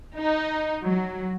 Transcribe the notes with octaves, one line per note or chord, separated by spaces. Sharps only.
D#4
F#3